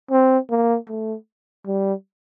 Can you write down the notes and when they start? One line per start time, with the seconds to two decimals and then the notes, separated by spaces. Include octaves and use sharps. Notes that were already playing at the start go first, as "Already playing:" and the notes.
0.11 C4
0.50 A#3
0.88 A3
1.66 G3